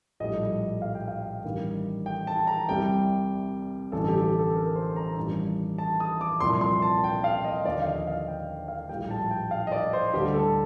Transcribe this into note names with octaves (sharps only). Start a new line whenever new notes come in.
A#1 A2 G3 D#5
F5
G5
F5
A1 G2 D#3 G3
G5
A5
A#5
C2 C3 G3 G5
A1 G2 D3 A4
A4
G4
G4
A4
A#4
C5
A#5
A1 G2 D#3 G3
A5
D#6
D6
C2 A#2 F3 C6
C6
A5
G5
F5
D#5
D#2 D3 F3 D5
F5
D#5
F5
G5
F5
A#1 A2 G3 G5
A5
G5
F5
D#5
D5
C5
D2 D3 G3 G4
A4